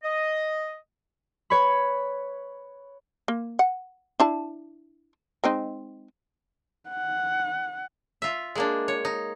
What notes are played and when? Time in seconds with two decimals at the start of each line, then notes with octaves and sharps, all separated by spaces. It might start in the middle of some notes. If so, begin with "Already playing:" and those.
0.04 D#5
1.50 B4 C#5 B5
3.28 A#3
3.59 F#5
4.20 D4 E4 A5
5.44 G#3 C4 D#4
6.90 F#5
8.22 F4 E5
8.55 G#3 A#3 D4
8.88 C#5
9.05 D#4